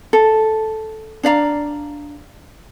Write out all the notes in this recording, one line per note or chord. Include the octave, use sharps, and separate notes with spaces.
A4
D4 D5 F5 A#5